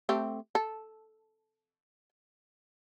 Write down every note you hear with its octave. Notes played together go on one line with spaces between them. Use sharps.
A3 C4 G4
A4